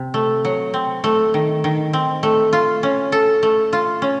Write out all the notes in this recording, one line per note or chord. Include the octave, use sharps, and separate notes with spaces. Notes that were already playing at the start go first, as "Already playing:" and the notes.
Already playing: C3
A3
F#3
C4
A3
D#3
D#3
C4
A3
F4
C#4
A4
A3
F4
C#4